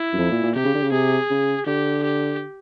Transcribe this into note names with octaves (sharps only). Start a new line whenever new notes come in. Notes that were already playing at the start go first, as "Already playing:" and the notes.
Already playing: E4
F#2
F2
A#2
A#2
C3 G4
C#3
D3
C#3
C3 G#4
C#3
D3 G4
G4